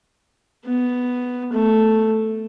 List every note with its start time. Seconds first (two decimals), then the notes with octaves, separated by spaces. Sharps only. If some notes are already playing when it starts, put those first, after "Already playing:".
0.66 B3
1.53 A3